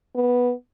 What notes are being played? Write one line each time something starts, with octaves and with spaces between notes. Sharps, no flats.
B3